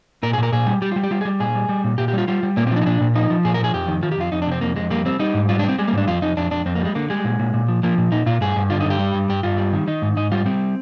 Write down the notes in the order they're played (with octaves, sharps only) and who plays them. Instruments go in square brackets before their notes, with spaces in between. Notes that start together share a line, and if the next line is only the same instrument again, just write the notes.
[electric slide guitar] A#2 A#4
G#4
A#2 A#4
A#2 G#4
G3
G3 G4
F4
G3
G4
G3 F4
G#4
G3
A#2 G#4
G3
G3
A#2
A#2 G4
G4
G3 F4
G3 F4
G3
A#2 A#3
C4
F3 D4
D#4
A#2 D4
A#2
F3 D#4
F3
A#2 G#4
A#4
F3 G#4
F2 G4
D#3
D#3 F4
G4
F2 F4
F2 D#4
D4
C3 C4
F2 A#3
F2 G#3
G3 A#3
G3 C4
G3 D#4
G#2
G3 F4
D4
G3 C4
G3 G#3
A#3
G#2 D4
F2 F4
F2 D#4
F2 D4
F2 D4
F2 C4
A#3
G3 G#3
D3 A#3
G3 G#3
A#2
A#2
A#2
F3
F3 A#3
A#2
A#2 D#4
A#2 F4
G2 G#4
G2
D3 F4
D#4
G2
G4
G3
G2
G2 G4
G2 F4
G3
D#3
D#3 D#4
G#2
G#2 D#4
G3 F4
G3 C4